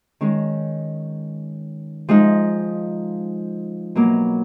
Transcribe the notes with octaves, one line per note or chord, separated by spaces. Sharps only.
D#3 G#3 C#4
F3 G#3 D#4
B2 F#3 A#3